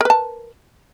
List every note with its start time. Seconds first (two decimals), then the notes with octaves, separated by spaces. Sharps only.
0.01 A#4
0.05 B4
0.10 A5